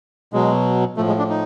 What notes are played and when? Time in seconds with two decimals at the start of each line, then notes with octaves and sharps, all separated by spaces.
0.33 B2 F#3 G#3
0.97 A2 F3 A3
1.08 G#3
1.18 D4
1.29 D#4